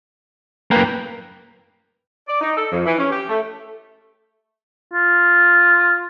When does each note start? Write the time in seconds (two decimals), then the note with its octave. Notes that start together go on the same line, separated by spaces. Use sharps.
0.71 F#2 A#3 B4 G5
2.28 D5
2.41 D#4
2.57 A4
2.72 F2
2.86 E3
2.98 C#4
3.11 G4
3.29 A3
4.93 F4